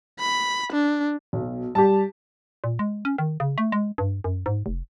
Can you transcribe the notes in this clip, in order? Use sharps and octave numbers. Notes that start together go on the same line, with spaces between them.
B5
D4
B1 B2
G3 G4 A5
A#2
G#3
C#4
D#3
C#3
A3
G#3
G2
F#2
G#2
F1